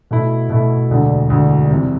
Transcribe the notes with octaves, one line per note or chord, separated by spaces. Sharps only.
B2 A3 E4
B2 A3 E4
E1 D2 D3
E1 D2 D3
E2 C3 G3